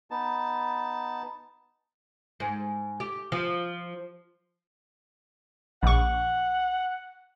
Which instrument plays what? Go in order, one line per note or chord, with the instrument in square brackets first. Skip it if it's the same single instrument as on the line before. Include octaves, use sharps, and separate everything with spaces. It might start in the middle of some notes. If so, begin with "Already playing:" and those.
[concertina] B3 D#4 A5
[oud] G#2
G4
F3
[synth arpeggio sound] A#1 C#6 [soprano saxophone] F#5